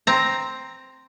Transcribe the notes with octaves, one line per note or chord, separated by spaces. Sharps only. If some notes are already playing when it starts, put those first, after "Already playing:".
C4 A#5